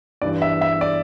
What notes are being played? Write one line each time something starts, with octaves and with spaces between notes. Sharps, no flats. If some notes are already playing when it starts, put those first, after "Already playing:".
G2 E3 D5
E5
E5
D5